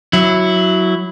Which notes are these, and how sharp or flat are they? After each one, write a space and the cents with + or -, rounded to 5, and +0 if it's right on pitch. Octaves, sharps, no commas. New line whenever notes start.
F#3 +0 E4 +0